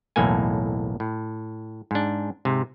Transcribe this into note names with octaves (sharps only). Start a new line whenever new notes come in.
B1 E2 A2 A#3 A4 G#5
A2
G#2 D4
G#2 C3